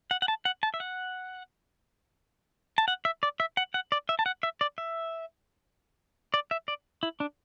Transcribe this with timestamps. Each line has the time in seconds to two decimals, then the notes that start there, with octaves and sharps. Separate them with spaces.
0.11 F#5
0.22 F#5
0.28 A5
0.45 F#5
0.63 A5
0.74 E5
0.80 F#5
2.78 A5
2.88 F#5
3.05 E5
3.23 D5
3.40 E5
3.57 F#5
3.74 F#5
3.92 D5
4.09 E5
4.19 A5
4.26 F#5
4.43 E5
4.61 D5
4.78 E5
6.34 D5
6.51 E5
6.68 D5
7.03 E4
7.20 D4